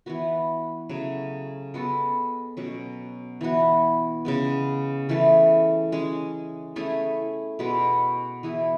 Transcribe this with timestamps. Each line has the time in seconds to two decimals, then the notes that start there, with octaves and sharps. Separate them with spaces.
0.06 E3 B3 F#4
0.89 C#3 F#3 A3 C#4
1.74 G#3 B3 F#4 A4
2.57 B2 F#3 C#4
3.41 E3 B3 F#4
4.25 C#3 G#3 B3
5.09 C#3 E3 A3
5.92 G#3 C#4 G#4
6.76 A3 C#4 E4 G#4
7.59 B2 G#3 B3 F#4
8.43 E3 B3 E4 G#4